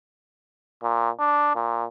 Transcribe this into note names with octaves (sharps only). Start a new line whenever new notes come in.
A#2
D4
A#2